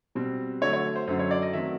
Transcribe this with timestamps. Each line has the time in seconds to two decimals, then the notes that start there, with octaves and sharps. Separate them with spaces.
0.15 B2 G3 C4
0.61 D3 F#3 A3 C#5
0.73 C#5
0.96 C5
1.07 F#2 D3 F#3 C5
1.19 C#5
1.31 D5
1.42 D#5
1.53 D#3 F#3 A3 C4 E5